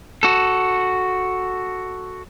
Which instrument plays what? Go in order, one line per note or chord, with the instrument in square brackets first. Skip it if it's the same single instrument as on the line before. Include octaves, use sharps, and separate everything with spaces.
[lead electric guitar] F#4 A4